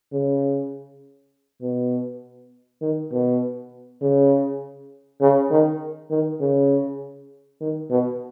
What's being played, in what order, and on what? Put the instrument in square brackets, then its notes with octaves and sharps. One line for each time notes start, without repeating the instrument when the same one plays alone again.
[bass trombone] C#3
B2
D#3
B2
C#3
C#3
D#3
D#3
C#3
D#3
B2